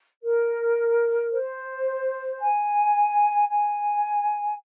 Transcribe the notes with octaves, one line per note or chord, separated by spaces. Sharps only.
A#4
C5
G#5
G#5